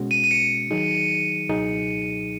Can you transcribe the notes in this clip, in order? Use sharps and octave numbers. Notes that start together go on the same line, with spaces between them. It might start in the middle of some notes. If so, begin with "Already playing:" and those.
Already playing: B2 G#3 C#4 F#4
D#7
D#7
C#7
D#3 F#3 D#4 G#4
C#2 B2 F#3 D#4 G#4